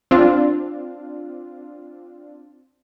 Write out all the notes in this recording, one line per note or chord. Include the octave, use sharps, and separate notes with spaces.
C4 D4 F4